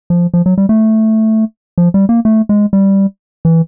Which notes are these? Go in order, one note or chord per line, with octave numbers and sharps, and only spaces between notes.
F3
F3
F#3
G3
A3
F3
G3
A#3
A3
G#3
G3
E3